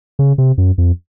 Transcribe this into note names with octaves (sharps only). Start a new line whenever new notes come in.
C#3
C3
F#2
F2